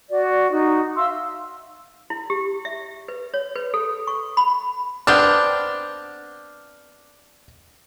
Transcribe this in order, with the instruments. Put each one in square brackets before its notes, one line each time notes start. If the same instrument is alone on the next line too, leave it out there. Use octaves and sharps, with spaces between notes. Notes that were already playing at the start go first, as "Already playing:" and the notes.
[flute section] F#4 D5
D#4 F#4
E5 F5 C6 E6
[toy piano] E4
G4
E5
B4
C#5
B4
A4
C#6
B5
[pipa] B3 C4 D4 [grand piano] F6 G6